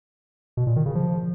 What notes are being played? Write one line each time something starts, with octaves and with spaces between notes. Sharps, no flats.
B2
A#2
D#3
C#3
F3